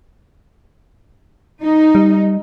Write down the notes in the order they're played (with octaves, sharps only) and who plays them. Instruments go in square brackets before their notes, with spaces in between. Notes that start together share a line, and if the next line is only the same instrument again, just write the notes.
[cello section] D#4
[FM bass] G3